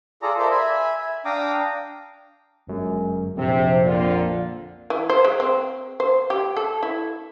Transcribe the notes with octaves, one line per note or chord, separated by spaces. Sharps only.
F4 G#4 A4 D5 A#5
A#4 C5 D5 E5 F5
E5 G#5 B5
E5
D4 F5 G5 A#5 D6 D#6
G1 F#2 G#3
A#1 F2 C3 C4 C5
D3 A#3 F4 D5
E3
C5
G#3
C4
C5
G4
A4
E4